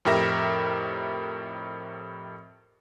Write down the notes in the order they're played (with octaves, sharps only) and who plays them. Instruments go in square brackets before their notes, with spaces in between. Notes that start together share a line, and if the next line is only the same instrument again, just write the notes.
[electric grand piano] F2 A2 G4 A#4 E5 A#6